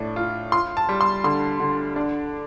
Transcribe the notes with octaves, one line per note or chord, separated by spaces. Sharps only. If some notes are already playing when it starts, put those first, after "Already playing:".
Already playing: A2 D4
F4
F4 C6
A5
G3
C6
D3 C6
D3
D4